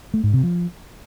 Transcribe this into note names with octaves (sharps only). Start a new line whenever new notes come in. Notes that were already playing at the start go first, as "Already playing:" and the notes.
A3
G#2
C3
F3